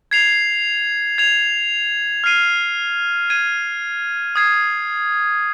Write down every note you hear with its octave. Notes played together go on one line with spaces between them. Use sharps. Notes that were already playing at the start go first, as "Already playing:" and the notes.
G#6 C7 F7
G#6 F7
F6 C7 D#7
G#6 D#7
D#6 G#6 C7